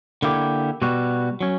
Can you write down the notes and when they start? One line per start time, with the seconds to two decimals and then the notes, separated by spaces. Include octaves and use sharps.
0.22 D3 A#3 E4 G4
0.82 B2 G3 B3 F#4
1.41 F#3 C#4